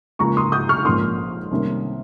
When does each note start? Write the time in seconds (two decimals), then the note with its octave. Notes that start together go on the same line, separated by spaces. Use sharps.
0.19 C#2 C#3 F3 A#3 A#5 C#6
0.37 C6 D#6
0.52 D#6 G6
0.69 C#6 F6
0.85 A#1 G#2 F3 A#3 C#4 C6 D#6
1.51 C2 C3 D#3 A#3 C#4